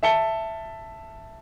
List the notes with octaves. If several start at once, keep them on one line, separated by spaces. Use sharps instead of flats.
E5 A5 C#7 G7